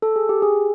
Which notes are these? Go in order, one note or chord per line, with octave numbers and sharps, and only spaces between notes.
A4
G#4
G4
G#4